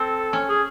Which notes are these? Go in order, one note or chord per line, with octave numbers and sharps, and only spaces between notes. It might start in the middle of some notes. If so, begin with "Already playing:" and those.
Already playing: C4 A4
C#4
G#4